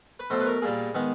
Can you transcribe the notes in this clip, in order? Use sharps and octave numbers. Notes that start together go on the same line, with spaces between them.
B4
B2 F#3 A3 C5
B4
A#4
A#2 G3 A#3 G#4
D#3 G#3 B3